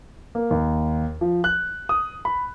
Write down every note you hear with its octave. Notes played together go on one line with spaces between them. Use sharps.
A#3
D#2
F3
F#6
D#6
B5